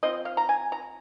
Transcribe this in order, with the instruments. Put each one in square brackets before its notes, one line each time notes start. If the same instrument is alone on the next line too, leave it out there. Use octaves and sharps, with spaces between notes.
[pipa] F3 C4 D#5
F5
A#5
G#5
A#5